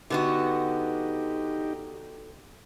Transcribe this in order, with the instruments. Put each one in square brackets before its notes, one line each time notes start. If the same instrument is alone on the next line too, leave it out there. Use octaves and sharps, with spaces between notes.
[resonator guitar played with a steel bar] D3 B3 F#4 [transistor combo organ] D#4 G4